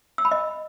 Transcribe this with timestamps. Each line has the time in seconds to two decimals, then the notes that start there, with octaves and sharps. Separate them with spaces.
0.18 E6
0.25 B5
0.31 D#5